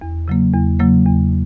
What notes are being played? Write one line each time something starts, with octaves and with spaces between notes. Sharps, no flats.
E2
C#3 F#3 A#3
E2
C#3 F#3 A#3
E2